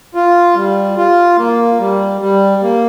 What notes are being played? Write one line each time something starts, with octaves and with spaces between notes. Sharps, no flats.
F4
G3
F4
A#3
G3
G3
A#3